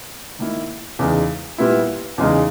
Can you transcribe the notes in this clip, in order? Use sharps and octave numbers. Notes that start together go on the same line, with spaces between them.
D#3 A#3 E4
E2 C#3 G#3 D#4
A#2 G3 B3 E4
E2 C#3 G#3 D#4